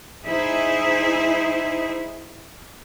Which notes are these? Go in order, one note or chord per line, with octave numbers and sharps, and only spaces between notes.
D#4 E4 G#4 C5 E5